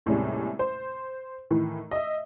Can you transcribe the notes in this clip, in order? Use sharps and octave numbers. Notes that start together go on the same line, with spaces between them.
D#2 A2 C3 G3 G#3 C#4
C5
A2 D#3 E3
D#5 E5